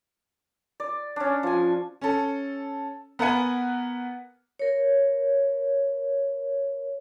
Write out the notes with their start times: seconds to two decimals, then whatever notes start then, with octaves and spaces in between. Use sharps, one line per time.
0.80 D5
1.16 C#4 D4
1.43 F3 G#5
2.01 C#4 A4
3.19 B3 A#4 B4 F#5 G#5
4.59 A#4 C#5